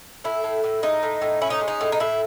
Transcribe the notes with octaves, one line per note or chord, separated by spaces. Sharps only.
A2 E4
A2
A2
G#3 D#4
A2
A2
C#4 E4
D#4
G#3
D#4
A2
D#4
A2 E4